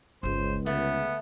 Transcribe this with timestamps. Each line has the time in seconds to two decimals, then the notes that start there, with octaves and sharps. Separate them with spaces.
0.23 G1 C#2 G#3 C5
0.66 D3 A3 B3